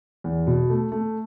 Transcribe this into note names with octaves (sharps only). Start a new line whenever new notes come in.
E2
B2
A3
A3